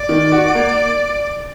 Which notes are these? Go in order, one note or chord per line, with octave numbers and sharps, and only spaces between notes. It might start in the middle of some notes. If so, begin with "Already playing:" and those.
Already playing: D5
D#3
F#4
A#3